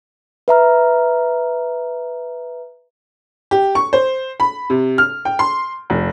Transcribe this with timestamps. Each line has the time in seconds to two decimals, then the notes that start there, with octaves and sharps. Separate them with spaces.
0.48 B4 E5 A#5 F6
3.51 G4
3.75 C#6
3.93 C5
4.40 B5
4.70 C3
4.98 F6
5.25 G5
5.39 C6
5.90 F1